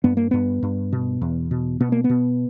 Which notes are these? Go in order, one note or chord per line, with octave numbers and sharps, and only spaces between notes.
G2 B3
A#3
G2 B3
G2
B2
E2
B2
B2 B3
A#3
B3
B2